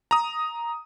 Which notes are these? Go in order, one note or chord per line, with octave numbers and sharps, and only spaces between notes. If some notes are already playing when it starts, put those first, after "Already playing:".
A#5 D#6